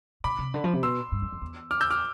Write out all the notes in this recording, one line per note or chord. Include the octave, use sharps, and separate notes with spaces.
B2 B5 D6
C3
D3
F3
C3
B2 C6 E6
G2
F2
F2
E2
D6 F6
E6 G6
D6 F6